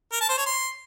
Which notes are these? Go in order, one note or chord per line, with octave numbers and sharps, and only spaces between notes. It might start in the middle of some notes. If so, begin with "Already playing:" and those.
A#4
A5
C5
C#5
C6